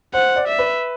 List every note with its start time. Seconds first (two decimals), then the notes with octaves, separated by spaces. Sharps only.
0.13 C5 F#5
0.36 D5
0.48 E5
0.58 B4